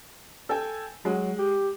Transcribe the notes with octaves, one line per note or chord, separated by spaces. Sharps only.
A4 G5 G#5
F#3 G#3
G4